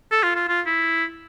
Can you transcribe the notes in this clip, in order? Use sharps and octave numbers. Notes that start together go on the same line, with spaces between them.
A4
F4
F4
F4
E4